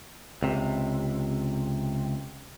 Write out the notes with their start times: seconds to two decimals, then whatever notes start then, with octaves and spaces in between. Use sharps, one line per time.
0.43 C#2 C3